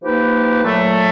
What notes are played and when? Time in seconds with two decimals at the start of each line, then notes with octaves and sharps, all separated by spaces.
0.01 F3 A#3 D#4 G4 B4
0.63 A#2 F#3 A3